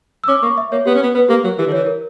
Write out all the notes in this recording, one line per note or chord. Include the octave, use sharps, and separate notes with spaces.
E6
C#4 D6
A#3 C#6
E5
A#3 C#5
B3 G4
C#4
B3
B3 B4
A#3 G4
F#3 A#4
E3 G4
D3
E3 C#5
A#4